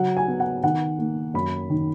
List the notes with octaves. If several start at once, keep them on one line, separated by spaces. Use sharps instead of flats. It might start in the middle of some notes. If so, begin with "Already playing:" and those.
Already playing: C#3 F#3 F#5
G#5
B3
F#5
D#3 F#5
A#3
F#2 B5
D#3